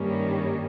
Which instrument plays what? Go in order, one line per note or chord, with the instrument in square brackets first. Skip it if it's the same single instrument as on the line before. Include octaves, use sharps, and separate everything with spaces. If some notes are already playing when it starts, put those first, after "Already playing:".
Already playing: [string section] G2 D#3 G3 A#3 C#4